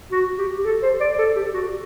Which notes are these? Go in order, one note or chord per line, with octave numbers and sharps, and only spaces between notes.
F#4
G4
G4
A4
C5
D5
A4
G4
F#4